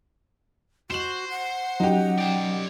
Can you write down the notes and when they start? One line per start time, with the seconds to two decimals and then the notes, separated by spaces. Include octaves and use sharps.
0.90 F#4 C5 E7 F#7
1.30 F#5
1.80 F3 F#3 C#4 D#4 G4
2.18 C5 D5